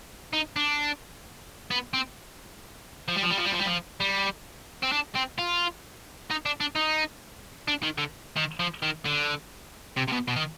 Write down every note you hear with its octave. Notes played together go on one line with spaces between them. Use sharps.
D#4
D4
B3
C4
F3
G3
F3
G3
F3
G3
F3
G3
F3
G3
C4
D4
C4
F4
D#4
D4
D4
D#4
D4
D#3
D3
D#3
F3
D#3
D3
C3
C3
B2
B2
D#3